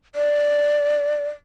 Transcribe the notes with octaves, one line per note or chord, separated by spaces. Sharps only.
D5